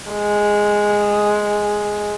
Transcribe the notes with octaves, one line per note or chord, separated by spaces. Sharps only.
G#3